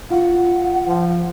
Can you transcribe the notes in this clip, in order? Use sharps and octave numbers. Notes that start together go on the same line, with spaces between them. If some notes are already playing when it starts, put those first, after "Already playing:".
F4 F#5
F3